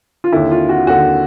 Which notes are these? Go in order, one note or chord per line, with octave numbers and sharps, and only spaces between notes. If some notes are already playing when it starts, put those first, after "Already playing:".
F4
D#2 D3 E4
F4
F#4
D#2 D3 F#4